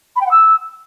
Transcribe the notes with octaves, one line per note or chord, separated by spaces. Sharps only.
B5
G5
F#5
E6